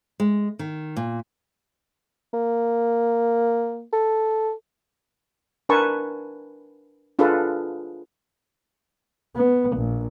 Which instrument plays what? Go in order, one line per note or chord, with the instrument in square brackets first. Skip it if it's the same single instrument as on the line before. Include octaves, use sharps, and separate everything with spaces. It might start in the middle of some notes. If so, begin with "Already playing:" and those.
[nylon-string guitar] G#3
D#3
A#2
[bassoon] A#3
A4
[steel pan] D4 A#4 B4 G#5 A5 C#6
D4 F4 G#4 A4 B4
[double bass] B3
A#1